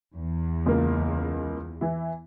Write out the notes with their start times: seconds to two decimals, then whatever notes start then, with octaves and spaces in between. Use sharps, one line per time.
0.16 E2
0.66 C#2 A#3
1.81 E3 E4